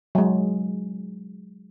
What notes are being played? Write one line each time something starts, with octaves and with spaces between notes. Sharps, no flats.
F#3 G#3